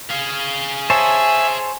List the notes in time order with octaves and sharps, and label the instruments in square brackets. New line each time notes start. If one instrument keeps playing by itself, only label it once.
[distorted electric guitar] G#4 F5
[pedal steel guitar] C5 C#5 A5 [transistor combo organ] E5 [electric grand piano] G#5